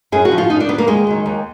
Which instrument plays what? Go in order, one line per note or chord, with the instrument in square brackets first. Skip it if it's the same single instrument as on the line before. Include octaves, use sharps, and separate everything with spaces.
[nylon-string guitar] F#2 G#4
F#4
F3
F4
F#2 D#4
D4
D3 F#3 B3
A#3
D#2 G#3
D#3 F#3
D#2